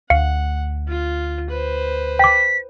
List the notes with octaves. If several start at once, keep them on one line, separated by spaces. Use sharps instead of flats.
D2 F5 F#5 C#7
F4
B4 C5
G5 D6 B6